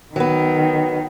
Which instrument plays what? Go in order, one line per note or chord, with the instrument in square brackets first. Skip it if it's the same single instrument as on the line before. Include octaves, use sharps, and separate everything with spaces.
[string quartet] D#3 [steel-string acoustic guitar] F#3 B3